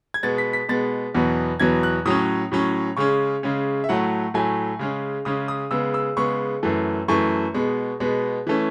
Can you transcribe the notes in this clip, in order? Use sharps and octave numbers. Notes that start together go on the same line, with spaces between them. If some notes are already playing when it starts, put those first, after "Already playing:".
G#6
B2 G#3 B3 A6
B6
B6
B2 G#3 B3 A6
E2 B2 F#3 B3
E2 B2 F#3 B3 G#6
F#6
A2 F#3 C#4 D#6
A2 F#3 C#4
C#3 G#3 C#4 C#6
C#3 G#3 C#4
E5
A2 F#3 A3 F#5
A2 F#3 A3 G#5
C#3 G#3 C#4
C#3 G#3 C#4 D#6
D#6
C#3 G#3 B3 E6
E6
C#3 G#3 B3 C#6
F#2 E3 A3
F#2 E3 A3 C#6
B2 G#3 B3
B2 G#3 B3
E3 A3 C#4